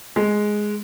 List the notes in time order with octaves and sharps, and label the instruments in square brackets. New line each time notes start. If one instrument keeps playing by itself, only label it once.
[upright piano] G#3